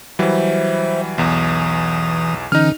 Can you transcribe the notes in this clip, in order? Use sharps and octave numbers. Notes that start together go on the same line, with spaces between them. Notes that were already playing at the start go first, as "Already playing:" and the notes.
E3 F#3 G3 C5 E5
B1 E2 E3 D#6
D3 E3 C#4 D#4 F6